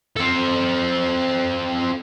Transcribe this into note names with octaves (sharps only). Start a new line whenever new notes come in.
C4 A4